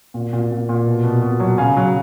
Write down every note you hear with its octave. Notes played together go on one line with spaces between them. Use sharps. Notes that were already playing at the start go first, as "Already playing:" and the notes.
A#2
A#2
A#2
A#2
B2
B2
B2
F#3
C#3 F5 G#5
F#3